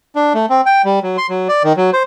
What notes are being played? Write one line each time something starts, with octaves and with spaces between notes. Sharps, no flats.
D4
A3
C4
G5
G3
F#3
C6
F#3
D5
D#3
F#3
C5